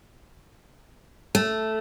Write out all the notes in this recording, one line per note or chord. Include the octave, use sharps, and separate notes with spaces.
A3